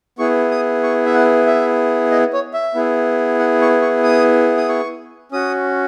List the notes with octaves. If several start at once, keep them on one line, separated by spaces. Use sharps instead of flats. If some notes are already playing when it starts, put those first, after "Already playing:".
B3 E4 G#4 C#6
D#6
C#6
E5
F#5
E5
D#5
C#5
E5
B3 E4 G#4
F#5
C#6
C#6
D#6
D#6
C#6
C#4 F#4 D#6